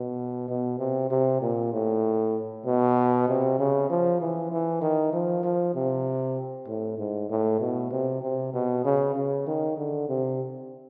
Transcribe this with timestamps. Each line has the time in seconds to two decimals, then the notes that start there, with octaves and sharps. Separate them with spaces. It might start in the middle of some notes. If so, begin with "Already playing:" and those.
Already playing: B2
0.49 B2
0.79 C3
1.10 C3
1.42 A#2
1.73 A2
2.66 B2
3.28 C3
3.59 C#3
3.90 F3
4.21 E3
4.52 E3
4.82 D#3
5.13 F3
5.44 F3
5.75 C3
6.68 A2
6.98 G#2
7.30 A2
7.60 B2
7.91 C3
8.22 C3
8.54 B2
8.85 C#3
9.15 C#3
9.47 D#3
9.78 D3
10.09 C3